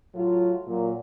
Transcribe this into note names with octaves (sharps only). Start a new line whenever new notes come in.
A2 F#3 F4
A#2 F#3